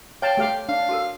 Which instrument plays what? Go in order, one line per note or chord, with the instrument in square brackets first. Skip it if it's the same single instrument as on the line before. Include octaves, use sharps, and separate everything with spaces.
[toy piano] C#5 [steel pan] F5 A5 [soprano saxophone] G5
[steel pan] A3 G4 F5
[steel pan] D4 [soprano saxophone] F5
[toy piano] F#4 A4 A#4